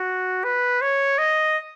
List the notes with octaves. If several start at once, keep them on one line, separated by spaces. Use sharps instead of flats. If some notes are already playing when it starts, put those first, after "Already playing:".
Already playing: F#4
B4
C#5
D#5